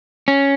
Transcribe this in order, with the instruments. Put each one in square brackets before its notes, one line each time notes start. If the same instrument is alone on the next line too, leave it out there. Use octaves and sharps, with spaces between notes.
[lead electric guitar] C#4